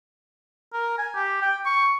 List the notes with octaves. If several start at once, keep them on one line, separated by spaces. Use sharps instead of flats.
A#4
G#5
G4
G5
C#6